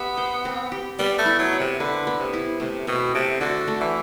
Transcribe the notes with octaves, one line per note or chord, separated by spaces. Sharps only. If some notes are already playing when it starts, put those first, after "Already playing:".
Already playing: B3 G4 E5
C5
C4
G4
G3 B3
A3
E4
F#3
D5
C3
D3 B4
B3
C3
E4
C3 A3
B2 C4
C3 A3
D3 F#4
A3
E3